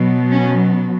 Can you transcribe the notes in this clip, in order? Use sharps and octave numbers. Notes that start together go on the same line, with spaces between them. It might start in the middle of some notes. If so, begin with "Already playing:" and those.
Already playing: B2 F#3
C#4